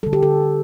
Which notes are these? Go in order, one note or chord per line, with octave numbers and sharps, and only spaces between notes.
D3 G3 A4
G4
A4